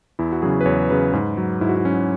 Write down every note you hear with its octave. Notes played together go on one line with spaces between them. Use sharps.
E2 E4
F#4
C#3 F#3 G#4
B4
E2 C#5
C#3 F#3 B4
G#2 B4
F#3
G#2 E4
F#4
E4
F#3 C#4